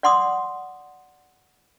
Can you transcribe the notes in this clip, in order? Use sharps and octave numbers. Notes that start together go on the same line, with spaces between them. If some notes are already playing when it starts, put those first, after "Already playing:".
D5 F#5 C6 D6 D#6